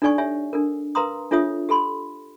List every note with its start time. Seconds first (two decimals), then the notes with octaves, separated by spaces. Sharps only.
0.02 D4 D#4 A4 D5 G#5 C#6
0.18 G4 C#5 E5 G#5
0.53 D4 A4 A#4
0.95 A#4 B4 F5 A#5 C6 D#6
1.31 D4 F4 A4 C#5 E5 D#6
1.69 G4 A4 B5 C6